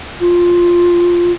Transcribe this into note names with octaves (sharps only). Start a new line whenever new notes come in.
F4